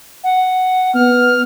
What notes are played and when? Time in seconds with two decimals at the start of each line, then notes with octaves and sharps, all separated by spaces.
0.24 F#5
0.94 B3 F6